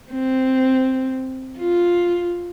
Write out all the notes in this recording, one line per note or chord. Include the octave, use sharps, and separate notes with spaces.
C4
F4